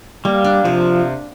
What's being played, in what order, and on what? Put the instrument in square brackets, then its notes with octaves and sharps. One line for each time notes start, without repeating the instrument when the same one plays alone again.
[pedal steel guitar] G3 [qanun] A#3
[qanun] D4
[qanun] C3 [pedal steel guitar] F3